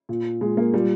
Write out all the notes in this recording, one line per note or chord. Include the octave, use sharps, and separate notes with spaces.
A#2
A#2 G#3
A#3
A#2 G3